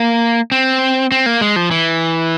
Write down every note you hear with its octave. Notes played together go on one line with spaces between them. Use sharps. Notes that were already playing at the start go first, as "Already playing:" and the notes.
Already playing: A#3
C4
C4
A#3
G#3
F3
E3